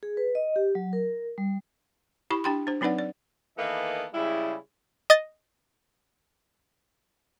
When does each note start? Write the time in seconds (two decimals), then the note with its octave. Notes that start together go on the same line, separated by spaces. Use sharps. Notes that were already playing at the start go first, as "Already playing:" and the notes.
0.03 G#4
0.17 B4
0.35 D#5
0.56 G4
0.75 F#3
0.93 A#4
1.38 G3
2.30 E4 G4 B5 C#6
2.44 D4 G4 G5 B5 C6
2.67 D4 C5
2.81 F#3 C4 D#4 B4 D5 F#5
2.99 D5
3.57 D#3 E3 A#3 B3 A4 D#5
4.13 C#3 G3 G#3 E4
5.10 D#5 A6